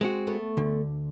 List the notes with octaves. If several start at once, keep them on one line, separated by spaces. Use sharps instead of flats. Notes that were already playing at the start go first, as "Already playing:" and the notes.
G#3 C4 F#4
A3 B3
D2 D3